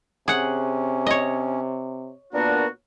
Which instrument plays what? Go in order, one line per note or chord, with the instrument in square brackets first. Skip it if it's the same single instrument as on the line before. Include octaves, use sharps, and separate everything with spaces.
[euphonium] C3 [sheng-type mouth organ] C#4 [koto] G#4 F#5
[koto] C#5 D#5
[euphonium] A#2 [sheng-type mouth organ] B3 A#4 [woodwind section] D4 F#4